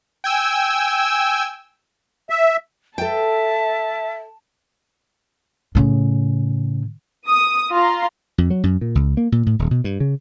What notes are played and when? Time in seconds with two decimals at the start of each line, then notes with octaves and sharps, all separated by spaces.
0.24 G5 G#5 E6
2.30 E5
2.98 A4 E5 G5 A5
5.75 A2 C#3
7.28 D#6
7.71 F4 A#5 C6
8.38 F2
8.50 F#3
8.63 F#2
8.81 A#2
8.95 C#2
9.17 A#3
9.32 A#2
9.46 A2
9.59 D#1
9.71 B2
9.84 G2
10.00 C#3